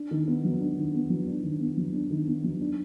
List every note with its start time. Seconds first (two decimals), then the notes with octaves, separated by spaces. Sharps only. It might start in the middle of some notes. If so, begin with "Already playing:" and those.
Already playing: D4
0.11 D#3
0.28 B3
0.45 F#3
0.60 D4
0.77 D#3
0.94 B3
1.10 F#3
1.27 D4
1.43 D#3
1.61 B3
1.77 F#3
1.93 D4
2.10 D#3
2.27 B3
2.44 F#3
2.60 D4